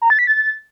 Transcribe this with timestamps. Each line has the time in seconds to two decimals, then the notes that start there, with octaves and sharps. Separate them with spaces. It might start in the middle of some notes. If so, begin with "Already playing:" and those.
0.02 A#5
0.10 A6
0.19 B6
0.27 A6